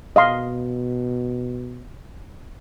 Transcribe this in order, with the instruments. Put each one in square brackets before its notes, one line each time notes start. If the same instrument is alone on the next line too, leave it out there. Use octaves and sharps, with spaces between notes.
[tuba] B2 [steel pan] D#5 F5 C6